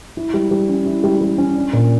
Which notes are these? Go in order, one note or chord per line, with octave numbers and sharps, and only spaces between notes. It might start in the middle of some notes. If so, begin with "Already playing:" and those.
E4
G3
G3
C#4
E4
G3
G3
C#4
D4
A#2